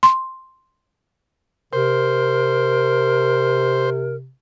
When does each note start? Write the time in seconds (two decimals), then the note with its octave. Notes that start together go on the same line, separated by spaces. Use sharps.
0.03 C6
1.73 C3 A#4 C5